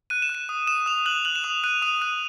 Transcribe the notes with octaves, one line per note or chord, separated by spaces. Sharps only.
F#6 D#7
E7
F#6
D#7
D#6
D#6 E7
D#6 F7
F#6 F#7
F#6 F#7
E7
D#6 F7
F#6 D#7
D#6 D#7
F#6 D#7